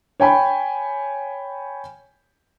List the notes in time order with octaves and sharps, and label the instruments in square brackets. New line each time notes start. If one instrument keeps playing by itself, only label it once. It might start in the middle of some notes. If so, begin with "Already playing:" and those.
[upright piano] C#5 G5 G#5 B5